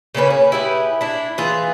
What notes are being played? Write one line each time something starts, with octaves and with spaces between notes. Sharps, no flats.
C#3 A#3 C#4 B4
G#4
E4 G4 G#4 B4
D4 E4
E3 F4 G#4